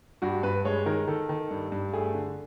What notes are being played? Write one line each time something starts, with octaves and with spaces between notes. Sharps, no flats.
G2 F#4
G2 B4
G#3 C#5
D#3 A#4
D#3 A4
D#3
G2
G2
A3 G#4
D3